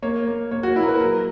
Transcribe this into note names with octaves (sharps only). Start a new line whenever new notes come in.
A#3 C#5
A#3
A#3 C#5
F#4
A#3 E4
A#4
B4
F#3 A#4